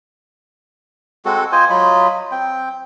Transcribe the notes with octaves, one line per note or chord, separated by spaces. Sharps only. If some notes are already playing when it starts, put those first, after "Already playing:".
G#3 C4 F#4 A4
F4 C5 D#5 G#5
F#3 F4 D#5 B5
C4 G5